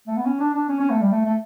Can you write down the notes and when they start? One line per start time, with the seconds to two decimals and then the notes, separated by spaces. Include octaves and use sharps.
0.08 A3
0.17 B3
0.26 C#4
0.40 D4
0.55 D4
0.69 C#4
0.80 C#4
0.90 A3
1.01 G3
1.12 A3
1.25 A3